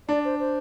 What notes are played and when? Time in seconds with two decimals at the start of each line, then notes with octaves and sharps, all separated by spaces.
0.09 D4 D5
0.25 C5
0.39 C5